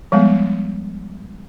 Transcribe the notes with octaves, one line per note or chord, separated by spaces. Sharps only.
F3 G3 G#3 B3